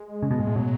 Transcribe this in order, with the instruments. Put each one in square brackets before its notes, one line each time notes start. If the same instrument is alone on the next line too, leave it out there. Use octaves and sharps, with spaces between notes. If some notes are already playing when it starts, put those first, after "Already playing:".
Already playing: [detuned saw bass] G#3
[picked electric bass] C#3
B2
G#2
A2
[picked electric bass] B2 [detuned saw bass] F#3